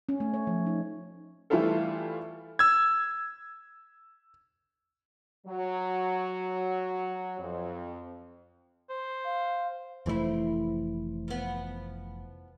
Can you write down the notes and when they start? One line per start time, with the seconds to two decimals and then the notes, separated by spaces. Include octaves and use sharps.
0.09 C#4
0.20 A3
0.34 C#5
0.47 F3
0.66 D#4
1.50 E3 G3 A3 E4 F4 A4
2.59 E6 G#6
5.47 F#3
7.39 F2
8.90 C5
9.25 F5
10.06 F1 E3 A3 C4 E4
11.28 F3 B3